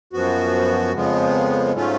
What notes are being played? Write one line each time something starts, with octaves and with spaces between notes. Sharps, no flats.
F#2 F3 B3 F#4
F2 C#3 F3 G#3 B3
G#2 F#3 A3 C#4 F4